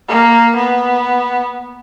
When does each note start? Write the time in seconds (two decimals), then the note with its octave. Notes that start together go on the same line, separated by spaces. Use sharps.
0.08 A#3
0.56 B3